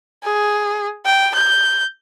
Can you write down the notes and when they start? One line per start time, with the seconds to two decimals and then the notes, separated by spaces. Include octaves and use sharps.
0.24 G#4
1.06 G5
1.35 G6